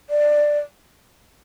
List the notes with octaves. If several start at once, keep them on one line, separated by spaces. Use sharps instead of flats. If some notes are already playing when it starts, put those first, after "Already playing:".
D5